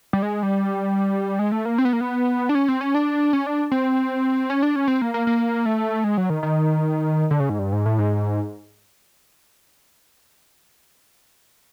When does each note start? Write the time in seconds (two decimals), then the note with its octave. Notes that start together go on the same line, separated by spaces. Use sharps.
0.13 G3
0.23 G#3
0.43 G3
1.39 G#3
1.52 A3
1.65 A#3
1.78 C4
1.85 B3
1.93 A#3
2.01 B3
2.49 D4
2.55 C#4
2.68 C4
2.81 C#4
2.94 D4
3.33 C#4
3.46 D4
3.72 C4
4.50 C#4
4.63 D4
4.76 C#4
4.88 C4
5.02 A#3
5.14 A#3
5.27 A#3
5.66 A3
6.04 G#3
6.17 F#3
6.30 D#3
6.43 D#3
7.31 D3
7.40 C#3
7.49 G#2
7.59 G2
7.72 G#2
7.86 A2
7.99 G#2